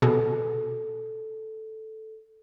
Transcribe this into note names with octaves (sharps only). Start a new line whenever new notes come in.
B2 G#4 A4